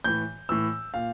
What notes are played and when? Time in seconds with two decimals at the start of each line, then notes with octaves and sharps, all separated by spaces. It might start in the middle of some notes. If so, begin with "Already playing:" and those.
0.04 A2 E3 G6
0.49 A2 E3 E6
0.94 A#2 F5